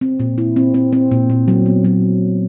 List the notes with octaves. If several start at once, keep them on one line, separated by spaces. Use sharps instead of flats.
C4
A#2
E4
C4
C4
C4
A#2
A#2
F#3
B3
F#3